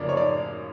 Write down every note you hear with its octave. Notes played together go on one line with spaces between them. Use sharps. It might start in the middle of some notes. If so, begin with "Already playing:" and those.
Already playing: F#2 C#3 F3 A#3 D5
C#5
D5